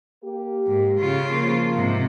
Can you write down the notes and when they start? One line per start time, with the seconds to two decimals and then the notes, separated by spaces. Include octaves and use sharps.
0.23 A#3 G4
0.67 G#2
0.99 C#3 F4
1.31 F3 A#3
1.75 G#2 C3